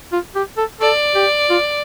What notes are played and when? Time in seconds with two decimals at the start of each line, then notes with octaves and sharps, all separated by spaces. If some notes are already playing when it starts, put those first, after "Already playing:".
0.12 F4
0.36 G4
0.57 A4
0.81 A4 D5
1.15 G4
1.50 F4